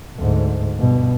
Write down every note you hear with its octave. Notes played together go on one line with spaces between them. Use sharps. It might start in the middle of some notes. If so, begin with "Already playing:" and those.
D2 G#2
G2 B2